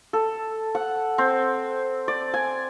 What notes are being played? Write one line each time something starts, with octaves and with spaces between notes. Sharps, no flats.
A4
F#5
C4
D5
G#5